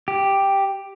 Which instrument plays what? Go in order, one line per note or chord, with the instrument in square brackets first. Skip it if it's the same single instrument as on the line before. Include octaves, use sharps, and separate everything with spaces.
[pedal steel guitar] G4